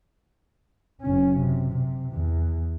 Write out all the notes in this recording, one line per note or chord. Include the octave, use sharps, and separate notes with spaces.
F#1 C#4
C3
C3
E2